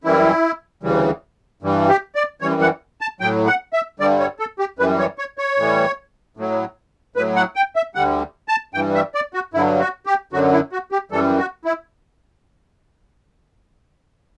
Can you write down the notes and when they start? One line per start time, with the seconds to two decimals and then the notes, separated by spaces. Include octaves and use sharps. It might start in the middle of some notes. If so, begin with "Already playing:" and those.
0.04 F#2 E3 G3 E4
0.83 D2 C#3 E3 G3
1.62 G2 E3 G3
1.89 G4
2.15 D5
2.41 F#2 E3 G3 C#5
2.62 F#5
3.01 A5
3.21 A2 F#3 G5
3.47 F#5
3.73 E5
4.00 G2 D3 G3 D5
4.20 C#5
4.39 A4
4.59 G4
4.79 F#2 E3 G3 B4
4.99 C#5
5.18 C#5
5.38 C#5
5.58 A2 E3 G3
6.37 A2 F#3
7.16 A2 F#3 B4
7.36 F#5
7.56 G5
7.76 E5
7.95 D2 D3 G3 F#5
8.48 A5
8.74 G2 E3 G3 G5
8.95 E5
9.14 D5
9.34 F#4
9.54 G2 D3 F#3 E4
9.80 F#4
10.06 G4
10.33 F#2 D3 F#3 F#4
10.53 E4
10.72 F#4
10.92 G4
11.11 F#2 E3 G3 A4
11.38 F#4
11.65 E4